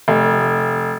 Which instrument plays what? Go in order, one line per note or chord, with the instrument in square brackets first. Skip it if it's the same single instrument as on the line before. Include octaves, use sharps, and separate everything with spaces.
[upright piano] F1